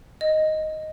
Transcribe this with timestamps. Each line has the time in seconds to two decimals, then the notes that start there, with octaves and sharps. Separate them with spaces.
0.21 D#5